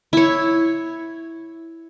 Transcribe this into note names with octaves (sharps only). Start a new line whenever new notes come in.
E4 C#5